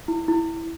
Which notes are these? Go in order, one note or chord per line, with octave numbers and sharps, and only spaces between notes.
E4
E4